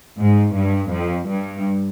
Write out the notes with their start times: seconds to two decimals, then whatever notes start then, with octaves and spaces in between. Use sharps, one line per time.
0.19 G#2
0.56 G2
0.92 F2
1.29 G2